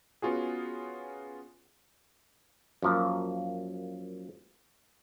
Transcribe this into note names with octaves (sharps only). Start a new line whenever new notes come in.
B3 C#4 F4 F#4 G#4
F#2 F3 A#3